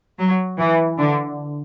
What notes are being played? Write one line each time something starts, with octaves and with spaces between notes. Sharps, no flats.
F#3
E3
D3